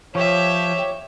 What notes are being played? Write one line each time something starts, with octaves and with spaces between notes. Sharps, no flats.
F3 G4 C#5 E5